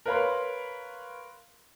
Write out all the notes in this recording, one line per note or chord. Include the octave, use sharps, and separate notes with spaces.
A#4 B4 C#5 F5 B5 C6